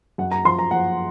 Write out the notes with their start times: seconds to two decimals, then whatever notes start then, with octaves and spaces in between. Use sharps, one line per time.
0.18 F#2 F#5
0.31 A#5
0.45 F3 C6
0.59 A#5
0.71 F3 F#5